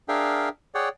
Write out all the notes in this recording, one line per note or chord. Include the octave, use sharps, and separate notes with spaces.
D4 G#4 A#4 E5 F5 G5
G#4 C#5 D5 F#5 G5